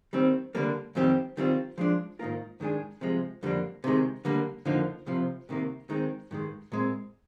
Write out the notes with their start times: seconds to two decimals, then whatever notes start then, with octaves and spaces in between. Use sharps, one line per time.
0.13 D#2 D#3 G3 C4
0.55 D3 G3 A#3 D4
0.95 F2 D#3 G3 C4 G4
1.37 D#3 G3 C4 F4
1.78 F3 G#3 D4
2.19 G#2 D#3 A#3 F4 A#4
2.60 G2 D#3 G#3 D4 G#4
3.01 C3 F3 G#3
3.43 F2 D3 G3 A#3 D4
3.84 C3 D#3 G#3
4.25 D3 G3 A#3
4.65 F2 D3 F3 A#3 D#4
5.06 C2 C3 F3
5.49 C2 C3 D#3 A#3
5.90 D#3 G#3 C4
6.31 G2 D#3 G#3
6.72 A#2 G#3 C4